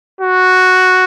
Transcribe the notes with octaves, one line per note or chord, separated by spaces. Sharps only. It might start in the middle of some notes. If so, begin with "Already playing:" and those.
F#4